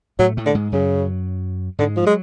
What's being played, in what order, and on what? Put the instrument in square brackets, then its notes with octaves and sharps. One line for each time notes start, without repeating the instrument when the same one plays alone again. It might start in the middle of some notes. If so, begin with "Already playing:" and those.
[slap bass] A2 A3 [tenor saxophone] F#3
[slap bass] A2 A3
[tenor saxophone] D3
[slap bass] G#2 G#3
[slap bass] F#2 F#3 [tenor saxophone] C#3
[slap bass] G#2 G#3 [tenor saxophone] D3
[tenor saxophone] F3
[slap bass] F#3 [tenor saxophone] G#3